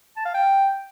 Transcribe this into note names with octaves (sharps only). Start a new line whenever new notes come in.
A5
F5
G5